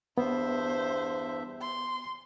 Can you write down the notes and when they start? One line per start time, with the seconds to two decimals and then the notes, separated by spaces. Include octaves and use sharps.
0.17 E2 G2 B3 C5 E5
1.62 C6